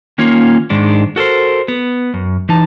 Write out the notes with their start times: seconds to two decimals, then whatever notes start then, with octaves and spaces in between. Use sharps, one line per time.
0.18 D#3 A#3 C#4 D#4 F4
0.70 G#2 D#3 G#3 D4
1.16 F#4 A4 A#4 C5
1.68 B3
2.14 F#2
2.49 E3 D#4 A5